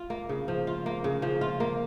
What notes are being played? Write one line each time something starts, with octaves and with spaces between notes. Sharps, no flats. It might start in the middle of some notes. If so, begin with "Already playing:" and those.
Already playing: F4
A#3
C#3
F3
F4
A#3
C#3
F3
F4
A#3